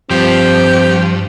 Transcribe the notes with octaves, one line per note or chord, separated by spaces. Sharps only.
G2 F3 C4 G4